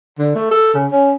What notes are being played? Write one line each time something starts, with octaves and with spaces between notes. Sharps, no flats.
D3
A3
A4
C#3
C#4